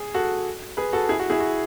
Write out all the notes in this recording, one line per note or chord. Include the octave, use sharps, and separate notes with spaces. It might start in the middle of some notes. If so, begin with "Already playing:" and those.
Already playing: G#4
F#4 A4
G#4 B4
F#4 A4
E4 G#4
F#4
E4 G#4
F#4